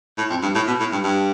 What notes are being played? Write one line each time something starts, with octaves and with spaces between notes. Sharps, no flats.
A2
F2
G2
A2
B2
A2
G2
G2